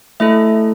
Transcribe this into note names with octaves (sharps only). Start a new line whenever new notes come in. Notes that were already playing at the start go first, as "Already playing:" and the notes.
A3 E4 A4 E5